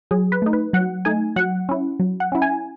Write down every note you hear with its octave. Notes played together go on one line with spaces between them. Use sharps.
F#3 G#4
B4
A3 D#4
B4
F#3 F#5
A3 D#4 G#5
F#3 F#5
C#4 E4
F#3
F#5
C#4 E4
G#5